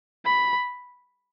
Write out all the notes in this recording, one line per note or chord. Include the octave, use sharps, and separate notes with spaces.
B5